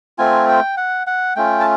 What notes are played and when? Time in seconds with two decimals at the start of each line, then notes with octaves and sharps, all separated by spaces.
0.18 A3 C4 F4 G#5
0.49 G5
0.77 F#5
1.07 F#5
1.36 A3 C#4 F4 G5
1.60 A5